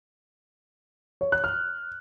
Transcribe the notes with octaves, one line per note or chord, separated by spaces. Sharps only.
C#5
F#6
F6